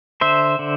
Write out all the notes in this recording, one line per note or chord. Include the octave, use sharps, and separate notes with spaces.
D3 C5 E5
D3